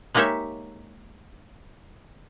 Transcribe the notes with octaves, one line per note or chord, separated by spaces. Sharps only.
G#3 A#3 D#4 G4 C#5 E5